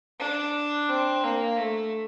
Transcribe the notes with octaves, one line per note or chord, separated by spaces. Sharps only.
D4
C4
A#3
A3